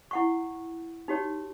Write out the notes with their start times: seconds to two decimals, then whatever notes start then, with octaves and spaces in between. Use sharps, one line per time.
0.11 E4 F#5 C#6
1.08 D#4 F#4 G4 C#5